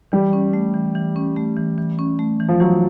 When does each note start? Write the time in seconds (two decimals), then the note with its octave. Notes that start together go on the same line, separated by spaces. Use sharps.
0.12 E3 G3
0.33 C#4
0.53 A3
0.74 E3
0.95 E3
1.16 C#4
1.36 A3
1.57 E3
1.78 E3
1.99 C#4
2.19 A3
2.40 E3
2.49 F3
2.60 E3 F#3